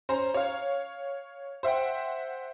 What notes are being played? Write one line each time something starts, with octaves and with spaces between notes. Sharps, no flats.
C#4 C5 A#5
C#5 F5
C5 E5 F#5 G5